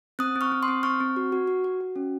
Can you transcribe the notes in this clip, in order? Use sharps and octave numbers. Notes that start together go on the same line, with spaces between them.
C4 D#6 F#6
C4
C#6 F6
C4
C6 D#6
C4
C4 C#6 F6
C4
F#4
F#4
F#4
F#4
F#4
C#4